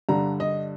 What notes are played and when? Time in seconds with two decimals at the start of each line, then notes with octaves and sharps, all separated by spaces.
0.09 G2 D3 G3 A#5
0.40 D#5